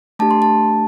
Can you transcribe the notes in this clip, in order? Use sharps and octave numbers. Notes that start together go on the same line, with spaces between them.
A3 D4 G4 A5
C6
A5